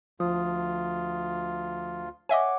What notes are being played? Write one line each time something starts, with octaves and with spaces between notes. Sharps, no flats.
D2 F3 F4 D#6
C#5 D#5 E5 F#5 G#5 D6